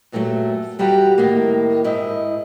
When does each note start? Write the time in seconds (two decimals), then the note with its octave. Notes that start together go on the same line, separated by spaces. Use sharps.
0.12 G2 A#2 F#3 G3 A3
0.79 E2 G3 F#4 G4 A#5
1.18 A2 D#3 A#3
1.84 G#2 E4 D#5